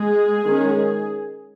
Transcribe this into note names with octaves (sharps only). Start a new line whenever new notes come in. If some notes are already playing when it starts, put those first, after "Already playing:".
Already playing: G#3 G#4
D#3 G#3 C#4